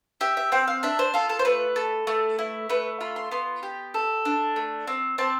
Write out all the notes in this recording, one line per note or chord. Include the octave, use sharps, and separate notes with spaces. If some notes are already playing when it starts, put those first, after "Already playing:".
G4 E5
E5
C4 G5
F5
D4 E5
C5
F4 A4
A4
C5
A3 B4
A4
A3
E4
A3 B4
F4 B5
C6
B3 C6
G4
A4
D4
A3
C4
C4 A5